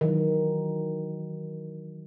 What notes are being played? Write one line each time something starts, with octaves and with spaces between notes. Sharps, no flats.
D#3 E3 F#3